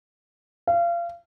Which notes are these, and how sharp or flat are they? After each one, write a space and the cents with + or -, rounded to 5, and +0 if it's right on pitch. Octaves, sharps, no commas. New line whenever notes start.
F5 -30